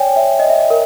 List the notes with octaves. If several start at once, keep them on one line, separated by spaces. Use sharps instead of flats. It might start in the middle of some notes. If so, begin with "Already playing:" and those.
Already playing: C#5 D5 G5 G#5
E5
D#5
E5
D#5
A#4